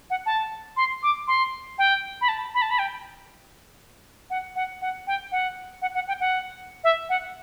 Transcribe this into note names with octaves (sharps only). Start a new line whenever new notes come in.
F#5
A5
C6
D6
C6
G5
B5
A5
B5
A5
B5
G5
F#5
F#5
F#5
G5
F#5
F#5
F#5
G5
F#5
E5
F#5